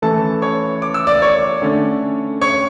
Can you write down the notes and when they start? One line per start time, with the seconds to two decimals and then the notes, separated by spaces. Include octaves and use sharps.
0.02 E3 A3 C#4 A4 A5
0.42 C#5 C#6
0.82 D6
0.94 E6
1.07 D5 D6
1.22 C#5 C#6
1.62 D3 A3 C#4
2.41 C#5 C#6